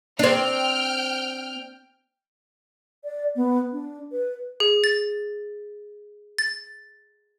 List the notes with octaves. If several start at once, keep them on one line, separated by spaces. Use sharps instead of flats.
C4 D4 G5 F6
D5
B3
D4
B4
G#4
A6
A6